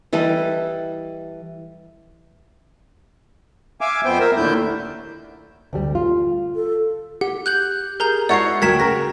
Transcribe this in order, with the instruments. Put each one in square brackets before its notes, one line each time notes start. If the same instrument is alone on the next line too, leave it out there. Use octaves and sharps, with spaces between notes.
[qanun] E3 G3 A4 D#5
[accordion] E5 F5 G#5 D6
F2 B3 C5 G5
A#4 E5
D#2 A#2 D3 A3 E4 G6
[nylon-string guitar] D2 G3
F4
[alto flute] A4
[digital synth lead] G4 [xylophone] F#5
[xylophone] F#6 G6 F#7
[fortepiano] G#4 [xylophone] A#4 A#5 G6
[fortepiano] G#2 E4 [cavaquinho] F#4 C#5 A#5 [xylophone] D5 C7
[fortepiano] D2 F#3 A#4 [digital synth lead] G5 [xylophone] G#6 B6 E7
[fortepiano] C#3 A#4 [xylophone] A#6